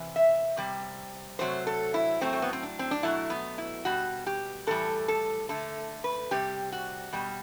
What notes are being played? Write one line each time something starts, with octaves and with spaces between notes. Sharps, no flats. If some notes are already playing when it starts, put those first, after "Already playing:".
Already playing: C3 E3
E5
C3 G3
C3 F#3 A3 C5
A4
E4
A2 F#3 A3 C4
A3
B3
C4
D4
C4
D4
B2 F#3 A3 E4
B3
E4
B2 G3 F#4
G4
A2 E3 G3 A4
A4
D3 A3 A4
B4
C3 G3 G4
F#4
B2 G3